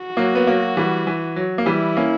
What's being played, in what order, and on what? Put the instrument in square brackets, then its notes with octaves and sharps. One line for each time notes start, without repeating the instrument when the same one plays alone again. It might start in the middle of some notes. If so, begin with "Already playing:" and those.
Already playing: [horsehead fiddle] F#4
[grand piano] F#3 A#3
B3
F#3 A#3
E3 G3
E3
F#3
A#3
[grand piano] E3 G3 [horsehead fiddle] E4
[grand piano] A#3 C#4